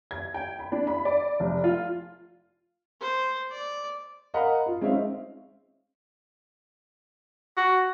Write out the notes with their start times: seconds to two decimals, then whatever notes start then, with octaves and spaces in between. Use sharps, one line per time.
0.11 G#6
0.34 G5
0.59 B5
0.72 D4
0.87 B5
1.05 D5
1.40 F1
1.64 F4
3.01 C5
3.51 D5
4.34 A#4 D#5 F5 F#5 A#5 B5
4.66 F4
4.81 G#3 C4 C#4 D#4 E5 F5
7.57 F#4